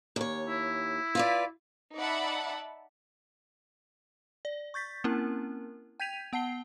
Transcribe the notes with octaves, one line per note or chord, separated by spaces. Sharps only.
D#2 C#5
E4
F4 B4 D5
D#4 D5 E5 F#5 A5 B5
D5
C#6 G6 A6 B6
A#3 C4 C#4 E4 A#4
G5 G6 G#6 B6 D#7 F7
B3 F#5 A5 C7 G7